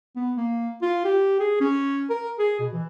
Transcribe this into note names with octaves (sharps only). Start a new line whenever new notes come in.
B3
A#3
F4
G4
G#4
C#4
A#4
G#4
B2
E3